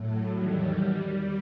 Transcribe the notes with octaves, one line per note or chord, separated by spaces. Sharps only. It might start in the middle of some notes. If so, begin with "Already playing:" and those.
Already playing: A2 F#3 A3
E2 D#3 F#3 G3